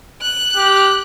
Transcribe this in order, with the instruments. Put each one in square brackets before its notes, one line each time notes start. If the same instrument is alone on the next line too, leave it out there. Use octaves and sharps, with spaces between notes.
[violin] F#6
[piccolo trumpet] G4